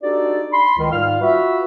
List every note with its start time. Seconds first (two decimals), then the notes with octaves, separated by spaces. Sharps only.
0.02 D4 D#4 F#4 G4 A4 D5
0.52 B5 C6
0.78 C#2 D#3
0.92 G#2 G3 F4 F5 F6
1.21 F4 F#4 B4 E5